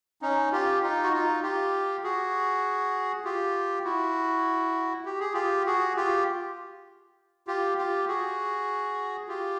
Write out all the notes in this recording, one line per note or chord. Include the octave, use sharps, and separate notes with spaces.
C#4 D#4
F4 G4
D#4 F4
F#4
D#4 F4
F4 G4
F#4 G#4
F4 G4
E4 F#4
G4
G#4
F4 G4
F#4 G#4
F4 G4
F4 G4
F4 G4
F#4 G#4
F4 G4